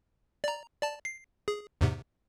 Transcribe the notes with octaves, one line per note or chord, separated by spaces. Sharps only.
D5 A#5
D5 A5
C7
G#4
E2 G#2 C3